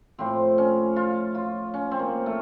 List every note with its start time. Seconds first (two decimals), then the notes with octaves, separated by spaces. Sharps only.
0.18 A2 F3 C4
0.58 C#4
0.96 F4
1.35 F4
1.74 C#4
1.91 C4
1.99 A#3
2.26 A3